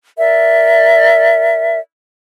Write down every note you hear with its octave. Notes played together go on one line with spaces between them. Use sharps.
A#4 D5 E5